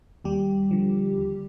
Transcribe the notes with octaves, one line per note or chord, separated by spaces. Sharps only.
D#2 G3 G4
D3 F3
D#2